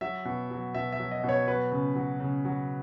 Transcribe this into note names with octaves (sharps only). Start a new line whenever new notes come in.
F#3 E5
B2
F#3
B2 E5
E5
F#3
D#5
B2
C#5
F#3 B4
C#3
F#3
C#3
F#3